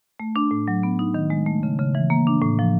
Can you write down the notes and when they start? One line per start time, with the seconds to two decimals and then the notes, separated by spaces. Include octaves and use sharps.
0.20 A3
0.36 D4
0.51 A2
0.68 F#3
0.83 B3
0.99 D#4
1.14 D#3
1.30 G#3
1.46 A3
1.63 C#3
1.79 C#3
1.95 E3
2.10 A#3
2.27 D4
2.42 A2
2.59 F3